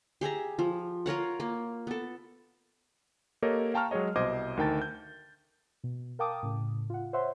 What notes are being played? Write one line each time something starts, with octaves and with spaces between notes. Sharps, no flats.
G4 G#4 E5 A#5
F3
F4 A#4 C#5 F#5
A#3
B3 A4
A#3 G4 A4 A#4 C#5 D#5
F5 G5 A5 A#5 C#6 F6
F#3 G#3 G#4 C#5 D#5
C2 B2 C5 D#5 D6 G#6
D2 D#3 A#4 G5 A5 A6
G6
B2
A#4 F5 G5 A5 D6 D#6
A2 C#3
F4 F#5
C5 C#5 E5 F#5 C6